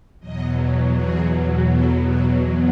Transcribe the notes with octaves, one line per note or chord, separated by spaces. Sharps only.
E2 B2 F#3 D#5
G#4
A4
B4